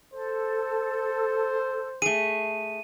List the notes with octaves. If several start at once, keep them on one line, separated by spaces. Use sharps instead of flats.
A4 C5
A3 G#4 D#7